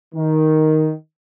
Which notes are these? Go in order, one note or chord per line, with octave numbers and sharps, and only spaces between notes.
D#3